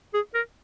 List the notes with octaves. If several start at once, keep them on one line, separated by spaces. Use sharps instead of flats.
G#4
A#4